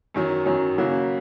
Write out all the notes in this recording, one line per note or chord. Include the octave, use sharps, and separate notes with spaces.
F#2 D#3 F#3 C#4
F#2 D#3 F#3 C#4
C#3 F#3 A#3 C#4 F#4